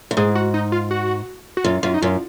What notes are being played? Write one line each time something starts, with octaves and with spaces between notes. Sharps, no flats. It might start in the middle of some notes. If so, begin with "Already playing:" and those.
F#2
G#2 G#4
F#4
D#4
F4
F#4
F#4
F#2 F4
F#2 F4
D#4
F#2 F4